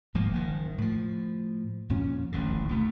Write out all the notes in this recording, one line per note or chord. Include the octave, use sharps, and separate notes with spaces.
D#1 G#2 F3 A#3
F#1 D#3
A2 F3
F2 A#2 F3 C#4
D#1 A1 F#2 D3
D#2 B2 A3